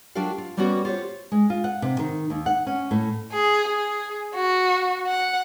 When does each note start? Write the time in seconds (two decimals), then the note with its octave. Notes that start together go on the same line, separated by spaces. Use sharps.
0.15 F#3 D4 F4 G4 A#4 F5
0.38 F4
0.57 G3 A#3 B3 C#4 F#4 G4
0.85 F4 G4 C5 C#5
1.32 G#3
1.50 F4
1.64 F#5
1.82 C3
1.99 D#3
2.30 D#2
2.46 F#5
2.67 C#4
2.91 A2
3.34 G#4
3.68 G#4
4.35 F#4
5.06 F#5